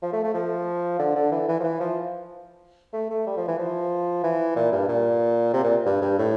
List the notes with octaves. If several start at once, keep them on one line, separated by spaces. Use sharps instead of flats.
F3
A3
A3
F3
D3
D3
E3
E3
F3
E3
F3
A3
A3
G3
F3
E3
F3
E3
A#2
G2
A#2
C3
A#2
G2
G2
A2